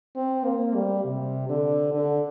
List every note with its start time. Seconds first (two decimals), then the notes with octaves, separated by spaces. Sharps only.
0.16 C4
0.45 A#3
0.75 G3
1.05 C3
1.49 D3
1.93 D3